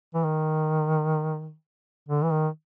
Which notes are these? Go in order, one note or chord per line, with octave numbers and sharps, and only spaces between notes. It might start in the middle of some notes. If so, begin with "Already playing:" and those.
E3
D#3
D3
E3
D#3